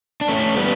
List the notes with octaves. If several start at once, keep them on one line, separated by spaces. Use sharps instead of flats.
D4
A3 C#4
G3 B3